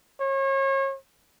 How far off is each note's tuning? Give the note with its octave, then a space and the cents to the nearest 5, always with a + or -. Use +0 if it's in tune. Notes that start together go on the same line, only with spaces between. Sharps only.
C#5 -35